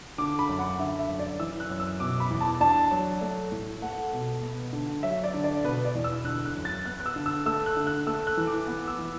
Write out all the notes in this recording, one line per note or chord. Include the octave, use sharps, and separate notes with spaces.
D3 D6
B5
F#2
F#5
D3 E5
E5
F#2
D5
E3 E6
F#6
F#2
E6
B2 D6
B5
E2
A5
D4 A5
F#3
A3
A2
A3 F#5
B2
B3
D3
F#3 E5
D5
D3
D5
B2 B4
D5
E2
E6
D3 F#6
F#6
F#2
A6
B3 F#6
F#6
E6
D3
E6
A3 E6
F#6
D3
F#6
A3 E6
F#6
E3
D6
B3 D6
E6
E3